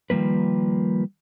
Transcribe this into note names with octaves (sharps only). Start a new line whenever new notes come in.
D#3 F3 G3 A#3 B4